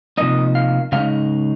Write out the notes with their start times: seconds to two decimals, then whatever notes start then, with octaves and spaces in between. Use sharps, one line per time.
0.18 C3 F3 A#3 D#4 D#5
0.55 F5
0.92 C#3 G#3 D#4 F5